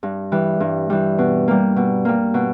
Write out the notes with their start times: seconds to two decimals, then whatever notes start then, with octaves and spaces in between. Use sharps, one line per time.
0.03 G2
0.32 E3 G3
0.60 G2
0.90 E3 G3
1.18 B2
1.48 G3 A#3
1.76 B2
2.05 G3 A#3
2.34 B2